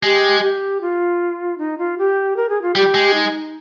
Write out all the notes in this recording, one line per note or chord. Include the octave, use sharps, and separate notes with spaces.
G#3 G4
G4
F4
D#4
F4
G4
A#4
G#4
F4
G3 G4
G#3
D#4